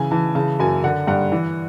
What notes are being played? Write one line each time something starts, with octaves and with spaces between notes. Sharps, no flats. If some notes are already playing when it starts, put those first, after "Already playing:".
Already playing: C#3 E3 G#5
E3 A5
C#3 A5
F#2 G#5
D3 F#5
G2 F#5
E3